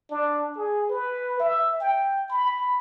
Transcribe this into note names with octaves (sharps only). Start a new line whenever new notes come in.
D4
G#4
B4
E5
G5
B5